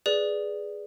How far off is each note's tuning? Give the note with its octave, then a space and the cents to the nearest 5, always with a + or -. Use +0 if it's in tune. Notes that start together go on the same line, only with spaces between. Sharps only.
G#4 +5 B4 +0 D5 +0